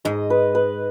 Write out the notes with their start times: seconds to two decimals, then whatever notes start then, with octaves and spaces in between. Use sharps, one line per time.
0.05 G#2 D#5
0.30 B4
0.55 B4